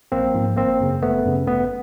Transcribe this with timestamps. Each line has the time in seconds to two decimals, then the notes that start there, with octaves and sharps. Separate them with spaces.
0.12 A#1 A#3 C4
0.34 G#2 F3
0.56 G1 A#3 C4
0.80 F#2 C#3
1.02 G1 A3 B3
1.25 F#2 C#3
1.47 G1 A3 B3